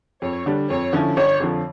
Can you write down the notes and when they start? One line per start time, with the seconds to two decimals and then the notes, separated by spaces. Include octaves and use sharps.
0.22 F2 C#5
0.46 D3 G3 D4
0.69 F2 C#5
0.93 D3 F3 C#4 E4
1.17 G1 C#5
1.40 F2 D3 F3